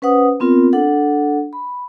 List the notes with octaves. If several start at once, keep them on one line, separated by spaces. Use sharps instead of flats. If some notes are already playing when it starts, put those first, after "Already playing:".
C#4 B4 C5 F#5 D#6
B3 C4 F4 A#4
D4 A4 F#5
B5